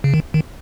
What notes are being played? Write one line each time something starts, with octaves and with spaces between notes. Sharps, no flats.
C#3
D#3
D#3